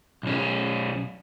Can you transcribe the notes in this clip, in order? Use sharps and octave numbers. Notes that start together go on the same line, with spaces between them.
B1 C#4